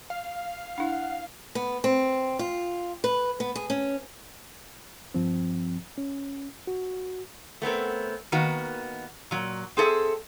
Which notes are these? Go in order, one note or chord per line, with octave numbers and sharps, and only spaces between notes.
F5
D4 E4 F#5
B3
C4
F4
B4
B3
G#4
C#4
G2 F3 C4
C#4
F#4
A3 B3 C4 A#4
D#3 A#3 B3 F#4
A#2 F#3
C4 G#4 A4 E5